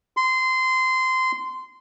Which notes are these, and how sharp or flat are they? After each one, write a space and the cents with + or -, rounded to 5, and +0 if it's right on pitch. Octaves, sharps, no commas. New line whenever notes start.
C6 -20